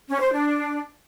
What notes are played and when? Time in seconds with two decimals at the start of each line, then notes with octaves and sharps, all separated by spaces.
0.09 C#4
0.20 C5
0.32 D4